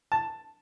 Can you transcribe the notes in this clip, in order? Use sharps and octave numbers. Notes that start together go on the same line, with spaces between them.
A5